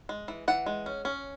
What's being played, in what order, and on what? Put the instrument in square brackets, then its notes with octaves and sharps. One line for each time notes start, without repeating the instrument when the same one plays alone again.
[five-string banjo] G#3
E3
E3 F#5
G#3
C#4
C#4